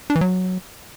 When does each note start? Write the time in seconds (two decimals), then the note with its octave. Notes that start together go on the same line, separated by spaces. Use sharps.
0.10 D4
0.15 E3
0.21 F#3